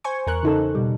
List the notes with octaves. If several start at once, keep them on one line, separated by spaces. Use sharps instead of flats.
C5 G#5 C#6
E2 A#4 F#6
C#3 D#4 A4
B2 G3